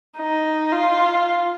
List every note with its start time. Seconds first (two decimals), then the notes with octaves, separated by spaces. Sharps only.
0.17 D#4
0.72 F4